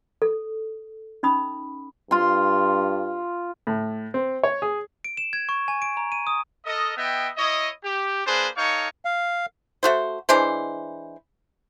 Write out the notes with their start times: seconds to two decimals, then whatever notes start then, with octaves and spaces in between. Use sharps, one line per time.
0.22 A4
1.23 C#4 D#4 B5 D#6
2.11 G2 F4 C6
3.67 A2
4.14 C4
4.43 C#5
4.62 G#4
5.04 D7
5.17 E7
5.33 G#6
5.49 C#6
5.68 G#5
5.82 D7
5.97 A#5
6.12 D#7
6.27 D#6
6.66 A4 A#4 D#5
6.97 B3 D#5 E5 G5
7.37 E4 C#5 D#5
7.84 G4
8.25 A#3 D4 G#4 B4 C5
8.56 D#4 A4 C#5 F5 C#6
9.05 F5
9.83 A3 F#4 C5
10.29 E3 G#3 D4 C5